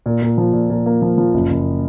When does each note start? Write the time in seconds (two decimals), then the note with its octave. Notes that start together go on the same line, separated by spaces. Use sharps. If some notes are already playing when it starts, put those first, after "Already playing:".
0.06 A#2
0.22 A#2
0.38 F3
0.53 A#2
0.70 A#2
0.86 A#3
1.02 F3
1.18 F3
1.34 F#1
1.50 F#1